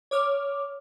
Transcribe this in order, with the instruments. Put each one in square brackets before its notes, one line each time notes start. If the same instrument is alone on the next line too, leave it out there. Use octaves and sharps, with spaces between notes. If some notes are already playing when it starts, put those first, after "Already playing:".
[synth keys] C#5 D6 F6